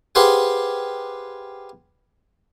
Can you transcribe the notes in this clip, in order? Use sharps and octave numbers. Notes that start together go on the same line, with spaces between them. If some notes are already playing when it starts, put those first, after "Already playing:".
G4 G#4 B4 C5 F5 F#5